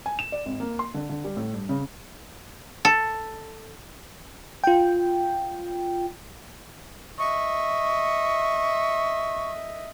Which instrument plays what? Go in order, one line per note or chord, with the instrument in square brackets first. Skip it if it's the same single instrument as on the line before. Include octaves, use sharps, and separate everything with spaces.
[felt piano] G#5
E7
D5
G#1
A#3
C6
D3
D3
G3
A2
G2
C#3
[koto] A4
[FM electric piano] F4 G5
[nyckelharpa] D#5 E5 [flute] C#6